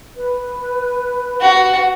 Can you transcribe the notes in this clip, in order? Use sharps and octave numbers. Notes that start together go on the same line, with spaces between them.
B4
F#4